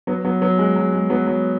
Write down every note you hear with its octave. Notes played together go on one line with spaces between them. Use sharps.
F#3 B3
F#3 B3
F#3 B3
G#3
F#3
G#3
F#3 B3
F#3